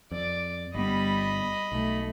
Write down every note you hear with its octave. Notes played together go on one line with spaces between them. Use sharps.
F2 D5
G1 G3 B3 D#5 B5
B1 A3